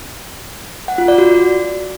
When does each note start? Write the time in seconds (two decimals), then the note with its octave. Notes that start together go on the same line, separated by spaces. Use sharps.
0.88 F#5
0.98 F4
1.08 D5
1.18 F#4